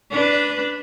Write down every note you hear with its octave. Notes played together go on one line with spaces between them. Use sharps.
D4 B4